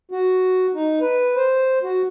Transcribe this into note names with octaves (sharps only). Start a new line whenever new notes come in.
F#4
D#4
B4
C5
F#4